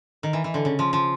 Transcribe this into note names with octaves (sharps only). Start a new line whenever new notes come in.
D#3
E3
E3
D3
C#3
F3
F3